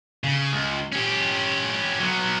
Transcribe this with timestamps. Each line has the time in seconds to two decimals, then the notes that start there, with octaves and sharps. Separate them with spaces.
0.24 C#3
0.52 C#2
0.92 C#4 G4
2.00 F#3 B3